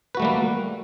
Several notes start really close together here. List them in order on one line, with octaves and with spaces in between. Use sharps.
B4 F#4 A3 G3 A#3